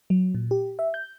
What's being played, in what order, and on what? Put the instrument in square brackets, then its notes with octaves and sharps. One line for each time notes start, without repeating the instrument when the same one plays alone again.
[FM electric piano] F#3
A#2
G4
E5
G6